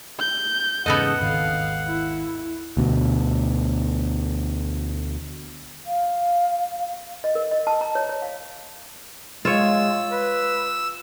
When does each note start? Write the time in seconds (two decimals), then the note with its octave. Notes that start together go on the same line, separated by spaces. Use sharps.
0.19 G6
0.86 E2 G#2 C#3 B3 A4 D#5 F#5
1.22 G#1 D#2 F5
1.87 E4
2.77 D2 B2
5.86 F5
7.24 D#5
7.35 A#4
7.51 D#5
7.67 A5
7.81 A#5
7.95 C#5
8.09 C#5
8.22 F5
9.45 G#3 F4 C#5 E6
10.10 B4